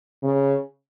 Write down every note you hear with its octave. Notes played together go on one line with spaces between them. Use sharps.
C#3